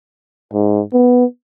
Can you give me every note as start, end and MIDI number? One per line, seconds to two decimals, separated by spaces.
0.54 0.81 44
0.93 1.25 59